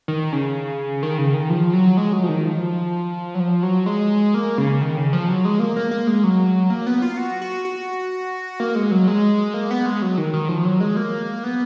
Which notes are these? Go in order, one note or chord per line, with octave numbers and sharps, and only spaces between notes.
D#3
C#3
D#3
C#3
D#3
F3
F#3
G#3
F#3
F3
D#3
F3
F#3
F3
F#3
G#3
A#3
C#3
D#3
C#3
F3
F#3
G#3
A#3
A#3
A#3
G#3
F#3
A#3
B3
F4
F#4
F#4
F#4
A#3
G#3
F#3
G#3
A#3
B3
G#3
F#3
D#3
D#3
F3
F#3
G#3
A#3
B3